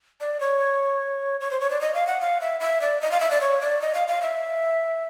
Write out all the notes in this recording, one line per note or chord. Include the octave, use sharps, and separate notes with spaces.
D5
C#5
C#5
C5
C#5
D5
D#5
F5
F#5
F5
E5
E5
D5
D#5
F5
E5
D5
C#5
D5
D#5
F5
F5
E5